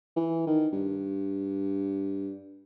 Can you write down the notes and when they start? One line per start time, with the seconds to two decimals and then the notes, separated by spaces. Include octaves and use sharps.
0.16 E3
0.47 D#3
0.72 G2